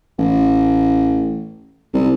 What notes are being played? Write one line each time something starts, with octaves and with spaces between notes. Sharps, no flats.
A1
C2